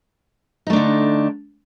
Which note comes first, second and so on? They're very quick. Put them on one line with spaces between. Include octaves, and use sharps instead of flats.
D#4 A3 D4 D3